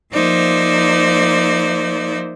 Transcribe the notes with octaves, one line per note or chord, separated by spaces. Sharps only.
F3 A#3 D#4 C5 D5 E5